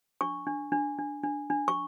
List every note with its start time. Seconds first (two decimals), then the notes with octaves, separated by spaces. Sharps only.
0.21 D4 C#6
0.47 D4
0.72 D4
0.98 D4
1.23 D4
1.50 D4
1.68 C#6